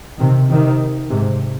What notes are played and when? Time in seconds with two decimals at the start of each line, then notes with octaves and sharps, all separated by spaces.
0.19 C3 D#3
0.49 C3 D#3
1.10 G#2 C3